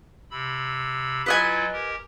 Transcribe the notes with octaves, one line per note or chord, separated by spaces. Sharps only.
C3 B5 E6
F#3 E4 F4 B4 D#5 G#5
G4 A#4